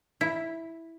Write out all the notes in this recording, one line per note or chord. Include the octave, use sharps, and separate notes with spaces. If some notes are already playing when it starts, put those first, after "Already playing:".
E4